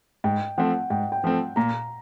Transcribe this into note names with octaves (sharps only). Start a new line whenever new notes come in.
G#2 G5
F3 A3 C4 F#5
G#2 G5
G5
F3 A3 C4
A#2 A#5